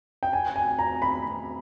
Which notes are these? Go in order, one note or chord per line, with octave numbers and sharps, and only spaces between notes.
G5
G#5
G#5
A#5
B5